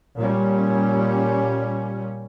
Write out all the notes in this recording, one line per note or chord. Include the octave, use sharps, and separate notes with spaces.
A#2 G3 C#4